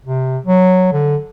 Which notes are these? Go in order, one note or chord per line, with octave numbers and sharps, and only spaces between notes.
C3
F#3
D3